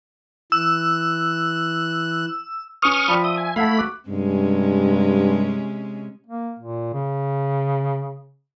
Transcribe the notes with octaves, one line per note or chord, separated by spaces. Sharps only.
E3 E6 F#6
C#4 B4 C#6 D#6 F6
F3 D5 G5 B5
E5 D#6
G#5
A3 E4 F5 F#5 A5 B5
F#4 D6
G2 C3 G#3 C#4
A#3
A#2
C#3